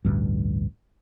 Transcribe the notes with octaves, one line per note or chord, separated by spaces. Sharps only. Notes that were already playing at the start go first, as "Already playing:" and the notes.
A1 D2 G2